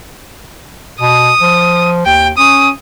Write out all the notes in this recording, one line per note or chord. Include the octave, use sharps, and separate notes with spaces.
B2 D#6
F3
D#2 G5
C#4 D#6